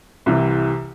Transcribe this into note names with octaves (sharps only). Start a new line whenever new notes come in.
C2 C3 E3